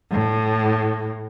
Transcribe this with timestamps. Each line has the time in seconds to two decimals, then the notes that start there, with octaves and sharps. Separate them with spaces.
0.11 A2